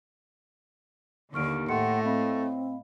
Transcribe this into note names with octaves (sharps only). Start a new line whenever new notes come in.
D#2 D3 C#6 F6 D7
A2 A3 F#5 G5 C6 C#7
C4 D#5 F5 B5